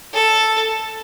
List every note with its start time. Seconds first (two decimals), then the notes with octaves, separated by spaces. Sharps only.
0.14 A4